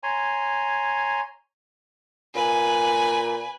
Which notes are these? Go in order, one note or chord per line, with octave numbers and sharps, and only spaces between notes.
C#5 G#5 A#5 C6
A#2 B4 G#5